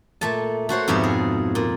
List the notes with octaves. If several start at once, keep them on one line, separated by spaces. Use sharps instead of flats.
A#2 A3 A5
A3 F#4 C5 C#5
F2 G#2 B2 G4 C#5 E5
G#4
A#2